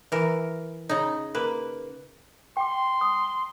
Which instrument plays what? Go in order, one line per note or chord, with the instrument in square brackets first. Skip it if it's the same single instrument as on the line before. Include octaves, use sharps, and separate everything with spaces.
[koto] E3 A#4
C#3 D#4
A#3 B4
[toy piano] G5 D6 [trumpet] C6
[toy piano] D#6